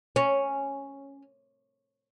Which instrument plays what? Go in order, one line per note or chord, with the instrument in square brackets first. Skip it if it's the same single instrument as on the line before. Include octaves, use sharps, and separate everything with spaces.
[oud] C#4